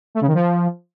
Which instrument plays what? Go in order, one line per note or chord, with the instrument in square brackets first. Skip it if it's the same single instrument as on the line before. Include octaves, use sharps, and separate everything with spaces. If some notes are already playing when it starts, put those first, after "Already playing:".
[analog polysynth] A3
C#3
D#3
F3